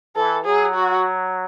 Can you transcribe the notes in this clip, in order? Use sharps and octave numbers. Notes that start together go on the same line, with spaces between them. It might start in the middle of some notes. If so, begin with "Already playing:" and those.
E3 A4
F#3 G#4
F#4